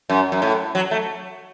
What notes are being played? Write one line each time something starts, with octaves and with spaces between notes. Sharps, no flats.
F#2
F#2
A2
F#3
A3